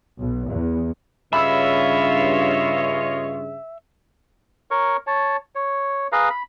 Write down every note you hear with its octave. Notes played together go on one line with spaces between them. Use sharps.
B1
E2
G2 C#3 F4 C#5 D#5 E5 B5 E6
A#4 C#5 C#6
C#5 A5
C#5
G#4 B4 F5 A#5
B5